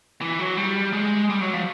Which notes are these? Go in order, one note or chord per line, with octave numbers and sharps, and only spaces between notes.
E3
F#3
G3
G#3
G3
F#3
F3